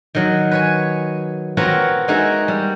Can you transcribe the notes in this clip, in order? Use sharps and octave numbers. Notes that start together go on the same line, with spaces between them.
D#3 F#3
B4 C#5 G#5
B3 C4 F4 F#4 A#4 C#5
G#3 A#3 D#4 F#4 G#4 E5
G3